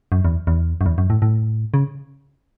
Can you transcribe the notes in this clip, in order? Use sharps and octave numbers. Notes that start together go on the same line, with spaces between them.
F#2
E2
E2
F#2
E2
F#2
A2
A2
C#3